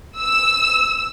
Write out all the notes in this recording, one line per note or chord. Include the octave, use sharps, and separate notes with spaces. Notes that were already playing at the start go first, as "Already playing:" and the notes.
E6